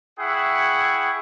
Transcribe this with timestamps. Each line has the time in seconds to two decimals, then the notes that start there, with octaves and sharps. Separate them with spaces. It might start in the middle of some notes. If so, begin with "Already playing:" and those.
0.20 E4 G#4 F#5 G5 C#6